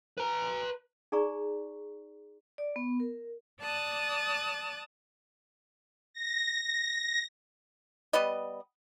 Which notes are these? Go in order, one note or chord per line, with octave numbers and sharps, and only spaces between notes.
B4 A#5
D#4 G#4 D5 A#5 C#6
D5
B3
A#4
D5 A5 D#6 F#6 A6
A#6
G3 B3 B4 D#5